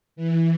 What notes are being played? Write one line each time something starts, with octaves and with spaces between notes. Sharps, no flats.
E3